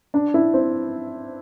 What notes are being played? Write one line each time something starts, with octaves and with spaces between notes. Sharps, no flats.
D4
E4
C4